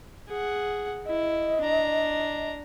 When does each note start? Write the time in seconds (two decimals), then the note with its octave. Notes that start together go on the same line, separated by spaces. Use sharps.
0.27 G#4 F#5
1.06 E4 D#5
1.60 D4 A#5